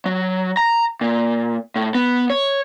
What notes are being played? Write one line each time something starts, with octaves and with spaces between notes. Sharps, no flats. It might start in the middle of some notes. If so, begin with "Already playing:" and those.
F#3
A#5
A#2
A2
B3
C#5